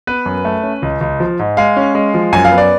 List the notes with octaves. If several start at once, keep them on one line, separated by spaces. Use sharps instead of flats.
B3 B4
F#2
A3
C#4
C#2
C#2
F3
G#2
G#3 F5
C#4
G#3
F3
F#2 G#5
F5
B3
D5